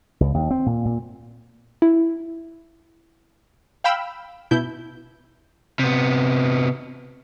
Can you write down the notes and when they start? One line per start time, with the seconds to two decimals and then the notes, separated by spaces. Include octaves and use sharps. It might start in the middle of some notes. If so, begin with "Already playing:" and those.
0.20 C#2
0.34 D#2
0.51 C4
0.66 A#2
0.85 A#2
1.82 E4
3.84 F5 G5 B5 E6
4.51 B2 E4 G6
5.79 C3 B3